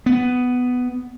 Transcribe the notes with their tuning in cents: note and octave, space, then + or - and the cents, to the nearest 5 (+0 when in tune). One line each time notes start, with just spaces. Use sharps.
B3 +10